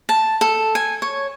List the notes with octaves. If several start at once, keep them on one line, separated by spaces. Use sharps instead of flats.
A5
A4
G#5
C#5